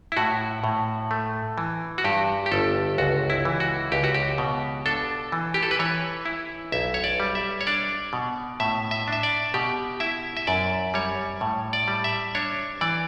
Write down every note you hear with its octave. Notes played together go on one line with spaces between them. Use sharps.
E4
A2 F#4
A2
A3
E3
F#4
G2 G4
G4
G1 A4
C#2 F#4
E4
E3
F#4
C#2 G4
F#4
G4
B2
D4 A4
E3
G4
A4
B4
E3 C#5
E4
B1 E5
C#5
D5
G3
E5
C#5
D4 D5
B2
A2 E5
E5
D4 E5
D5
B2 G4
E4 E5
E5
F#2 D5
G3 C#5
A2
D5
G3
E5
D4 C#5
E3 D5